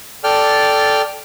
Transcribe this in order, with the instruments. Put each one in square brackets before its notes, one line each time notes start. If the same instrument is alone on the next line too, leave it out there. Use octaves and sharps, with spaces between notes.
[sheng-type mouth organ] A4 D5 G5 F6